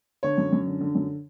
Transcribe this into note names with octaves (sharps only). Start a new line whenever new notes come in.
D3 C#5
F#2
F#2
D3
D3
F#2